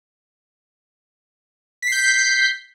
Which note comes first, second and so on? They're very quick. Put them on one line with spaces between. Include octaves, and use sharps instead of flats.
B6 C7 G6